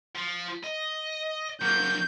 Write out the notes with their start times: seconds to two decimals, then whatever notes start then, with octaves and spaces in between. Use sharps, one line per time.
0.15 F3
0.64 D#5
1.61 F#3 A#3 G6